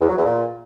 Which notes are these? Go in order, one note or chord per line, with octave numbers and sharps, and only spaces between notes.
E2
F#3
E2
A#2